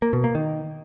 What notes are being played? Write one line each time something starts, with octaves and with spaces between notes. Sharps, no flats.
A#3
B2
A#3
D#3